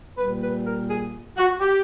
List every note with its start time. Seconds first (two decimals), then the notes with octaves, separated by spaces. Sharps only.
0.18 A#2 G3 B4
0.42 B4
0.65 A#4
0.89 G#4
1.37 F#4
1.60 G4